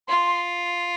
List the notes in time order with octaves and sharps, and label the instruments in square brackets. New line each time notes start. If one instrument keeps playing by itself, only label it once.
[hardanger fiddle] F4 [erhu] C6